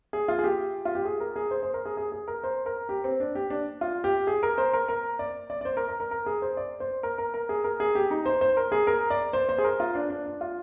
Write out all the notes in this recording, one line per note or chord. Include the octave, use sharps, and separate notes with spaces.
G#4
F4
G#4
G4
F4
G4
G#4
A#4
G#4
C5
C5
A#4
G#4
G#4
G#4
A#4
C5
A#4
G4
C4
D4
G4
D4
F4
G4
G#4
A#4
C5
A#4
A#4
D5
D5
D5
C5
A#4
A#4
A#4
A#4
G#4
C5
D5
C5
A#4
A#4
A#4
G#4
A#4
G#4
G4
D#4
C5
C5
A#4
G#4
A#4
D5
C5
C5
G#4
A#4
F4
D4
D4
D4
F4